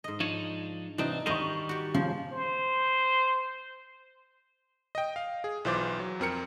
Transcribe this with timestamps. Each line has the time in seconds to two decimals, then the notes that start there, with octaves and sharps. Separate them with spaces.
0.04 G#2 D#5
0.20 F3 D4 D#4 C#5
0.98 C2 E3 C4 D4 D#4
1.26 D#3 G3 A#4 C5 D#5 C#6 D#7
1.69 F#4 G4
1.94 C#3 F3
2.33 C5
4.95 D#5 G5
5.16 F5
5.44 G#4
5.65 B1 E3 F4 C5 D6 A6
5.99 F#3
6.20 F2 C4 A#4 C#7